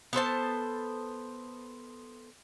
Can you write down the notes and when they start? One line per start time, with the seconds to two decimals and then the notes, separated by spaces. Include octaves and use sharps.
0.13 B3 A4 C5 A5